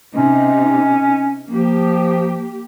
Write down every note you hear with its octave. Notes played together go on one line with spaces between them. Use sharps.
C3 C#4 D#4
F3 A#3 G4